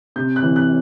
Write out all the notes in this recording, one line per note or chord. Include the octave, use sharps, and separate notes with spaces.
C3 G6
F#6
E3
F#6